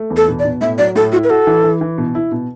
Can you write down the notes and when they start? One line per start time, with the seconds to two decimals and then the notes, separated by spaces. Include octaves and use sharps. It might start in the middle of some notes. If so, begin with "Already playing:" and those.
Already playing: A3
0.10 E2
0.17 A4
0.28 B2
0.39 D5
0.45 B2
0.61 A2 E5
0.78 F#3 D5
0.95 A2 A4
1.12 E4 F#4
1.24 B4
1.30 F#4 A4
1.47 E3
1.64 E3
1.81 E3
1.98 B2
2.15 E4
2.32 B2